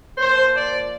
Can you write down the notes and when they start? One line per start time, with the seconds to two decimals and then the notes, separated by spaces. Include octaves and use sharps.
0.18 A#2 F3 C5
0.53 D5